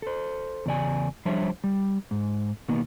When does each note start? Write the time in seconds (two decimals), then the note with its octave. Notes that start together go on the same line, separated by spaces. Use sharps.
0.02 A4 C5
0.66 E2 C#3 D5 G#5
1.25 F3 G3 D4 C5 C#5 E5
1.64 G3
2.11 G#2
2.68 B2 D#3 A#3 B3